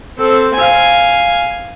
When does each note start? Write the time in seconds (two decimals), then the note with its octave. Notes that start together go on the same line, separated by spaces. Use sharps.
0.18 C4 A4
0.55 F5 G#5